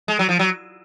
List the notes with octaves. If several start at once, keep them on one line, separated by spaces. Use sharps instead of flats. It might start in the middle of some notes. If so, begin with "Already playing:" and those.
G#3
F#3
F3
F#3